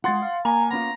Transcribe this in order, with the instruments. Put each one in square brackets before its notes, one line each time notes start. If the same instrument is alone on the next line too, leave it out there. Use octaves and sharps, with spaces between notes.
[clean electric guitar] G#3 F4 [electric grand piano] F#5 C6 A6
[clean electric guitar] F5
[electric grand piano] A#3 [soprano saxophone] G#5 [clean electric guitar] A#5
[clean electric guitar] B3 C#4 F4 [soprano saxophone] A#5